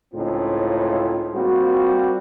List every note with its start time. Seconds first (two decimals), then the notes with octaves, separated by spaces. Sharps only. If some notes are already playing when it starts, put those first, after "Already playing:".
0.14 C#2 A2 C#3 C4 D#4 F4
1.33 G3 A#3 C4 F4 F#4